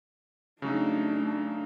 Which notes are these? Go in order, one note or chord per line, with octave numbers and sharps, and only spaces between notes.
C#3 F#3 A3 D4 D#4